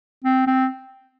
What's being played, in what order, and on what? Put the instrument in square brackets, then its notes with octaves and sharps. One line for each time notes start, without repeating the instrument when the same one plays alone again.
[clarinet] C4
C4